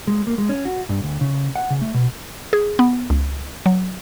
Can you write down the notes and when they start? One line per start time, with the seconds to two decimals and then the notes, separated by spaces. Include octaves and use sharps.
0.08 G#3
0.27 A#3
0.38 G#3
0.49 C#4
0.65 F#4
0.89 G2
1.03 D2
1.21 C#3
1.56 F#5
1.70 C#3
1.81 A3
1.94 B2
2.53 G#4
2.79 B3
3.10 C#2
3.66 F#3